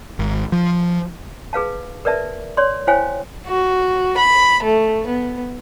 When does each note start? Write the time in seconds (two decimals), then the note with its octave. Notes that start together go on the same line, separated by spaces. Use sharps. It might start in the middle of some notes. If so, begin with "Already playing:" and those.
0.19 G#1
0.52 F3
1.53 G#4 B4 F5 A5
2.05 A#4 B4 D5 E5 A5
2.57 C#5 D5 C6
2.87 E4 C5 C#5 F5 G5 G#5
3.47 F#4
4.18 B5
4.64 A3
5.07 B3